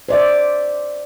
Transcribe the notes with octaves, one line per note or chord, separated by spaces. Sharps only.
C5 D5 E5